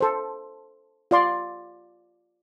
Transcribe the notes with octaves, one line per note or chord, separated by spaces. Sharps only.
A4 C5
F4 D5 C6